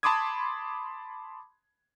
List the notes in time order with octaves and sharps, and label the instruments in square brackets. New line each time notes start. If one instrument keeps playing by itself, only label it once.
[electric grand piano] A5 B5 C6 D6 D#6 G#6